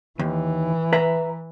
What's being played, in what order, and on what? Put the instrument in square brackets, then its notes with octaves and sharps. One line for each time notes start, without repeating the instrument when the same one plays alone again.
[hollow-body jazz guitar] D#2 [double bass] E3
[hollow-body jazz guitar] B4 E5 A#5